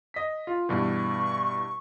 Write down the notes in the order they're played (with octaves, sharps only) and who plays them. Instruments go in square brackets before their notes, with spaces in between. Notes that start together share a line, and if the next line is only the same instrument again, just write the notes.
[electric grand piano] D#5 B6
F4
[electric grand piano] G2 B2 E3 [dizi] C#6